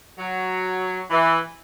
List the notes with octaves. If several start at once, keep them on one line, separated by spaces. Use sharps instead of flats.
F#3
E3